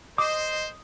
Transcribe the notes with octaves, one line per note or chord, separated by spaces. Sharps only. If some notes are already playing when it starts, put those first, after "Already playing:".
C5 D#5 D6 D#6